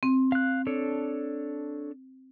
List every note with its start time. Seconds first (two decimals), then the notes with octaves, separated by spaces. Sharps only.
0.03 C4
0.32 F5 F#6
0.67 D4 A4 C#5